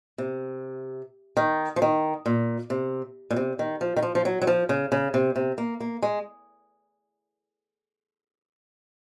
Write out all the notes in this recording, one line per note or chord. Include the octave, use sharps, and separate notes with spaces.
C3
D#3
F3
D#3
A#2
C3
A#2
C3
D#3
F3
D#3
F3
F3
F#3
F#3
F3
C#3
C#3
C3
C3
A#3
A#3
G#3